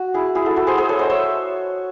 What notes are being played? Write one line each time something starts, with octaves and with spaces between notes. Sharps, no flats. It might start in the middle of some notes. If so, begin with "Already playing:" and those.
Already playing: F#4
E4 G#4
E4 G#4
F#4 A4
F#4 A4
G#4 C5
G#4 C5
A4 C#5
C5 D#5
C#5 E5